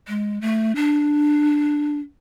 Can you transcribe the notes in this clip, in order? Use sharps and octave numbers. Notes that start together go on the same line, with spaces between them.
G#3
A3
D4